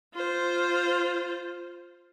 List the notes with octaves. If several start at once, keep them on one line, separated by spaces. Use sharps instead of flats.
F4 C5